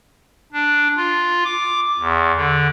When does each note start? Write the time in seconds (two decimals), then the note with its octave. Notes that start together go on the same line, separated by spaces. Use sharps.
0.52 D4
0.97 F4
1.44 D6
1.99 E2
2.37 D3